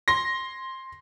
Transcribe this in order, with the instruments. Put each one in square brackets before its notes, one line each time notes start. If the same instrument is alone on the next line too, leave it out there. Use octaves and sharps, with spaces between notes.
[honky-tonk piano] C6 A#6